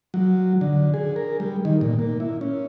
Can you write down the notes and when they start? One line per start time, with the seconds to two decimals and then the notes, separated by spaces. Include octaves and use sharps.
0.14 F#3
0.61 D3
0.94 G#4
1.16 A#4
1.40 G3
1.65 D#3
1.81 A#2
1.99 A#3
2.20 E4
2.41 C#4